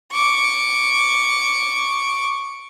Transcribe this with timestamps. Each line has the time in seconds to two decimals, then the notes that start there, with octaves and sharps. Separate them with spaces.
0.12 C#6 D6